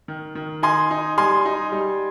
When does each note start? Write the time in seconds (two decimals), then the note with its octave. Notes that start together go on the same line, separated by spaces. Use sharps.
0.08 D#3
0.35 D#3
0.63 D#4 G#5 C6
0.91 D#4
1.17 G3 G#5 C6
1.45 D#4
1.72 G3